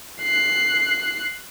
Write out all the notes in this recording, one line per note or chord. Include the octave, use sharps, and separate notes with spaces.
F#6 C7